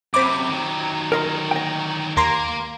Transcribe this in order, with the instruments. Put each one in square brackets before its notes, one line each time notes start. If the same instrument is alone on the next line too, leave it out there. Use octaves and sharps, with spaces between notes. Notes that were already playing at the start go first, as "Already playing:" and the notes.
[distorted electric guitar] F#2 C3 [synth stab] C4 B5 D6
[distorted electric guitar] D#3 F#3
[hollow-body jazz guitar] A#4 D#5 C6
D#5 G5
[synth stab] D#2 A#5 C6 [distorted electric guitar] A#3